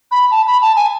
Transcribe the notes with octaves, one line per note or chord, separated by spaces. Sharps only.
B5
A5
B5
A5
G#5